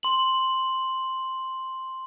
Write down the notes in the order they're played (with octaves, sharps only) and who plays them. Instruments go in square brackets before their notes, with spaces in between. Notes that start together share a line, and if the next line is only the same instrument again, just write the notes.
[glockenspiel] C6 F#7